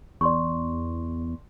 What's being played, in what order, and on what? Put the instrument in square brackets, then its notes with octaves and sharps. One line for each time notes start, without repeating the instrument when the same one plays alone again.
[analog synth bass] E2 [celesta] D5 C6 C#6